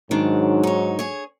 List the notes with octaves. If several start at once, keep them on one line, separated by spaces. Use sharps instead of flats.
G#2 D#3 F#3 D4
D#4 C#5
G#4 C#5